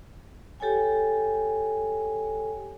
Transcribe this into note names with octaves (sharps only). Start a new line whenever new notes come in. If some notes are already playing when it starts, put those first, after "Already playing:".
G4 A4 C#5 G5 G#5